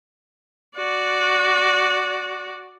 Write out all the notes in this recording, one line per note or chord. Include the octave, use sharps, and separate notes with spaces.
F#4 D5